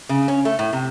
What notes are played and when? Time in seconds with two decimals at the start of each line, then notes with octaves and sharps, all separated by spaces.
0.09 C#3
0.28 C#4
0.45 A3
0.59 A2
0.73 C3